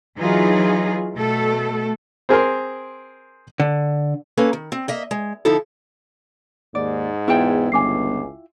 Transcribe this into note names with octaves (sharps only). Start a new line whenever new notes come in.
E3 F#3 D#4 F4 G#4
B2 A3 A4
C4 G#4 A#4 C6
D3
A#3 C#4 A4 B4
D#3
C4
A#3 D#5 E5
G#3
D3 F3 D#4 E4 A4
D#2 G#2 D5
E2 E4 F4 G5
G1 C#2 G#5 D6 C7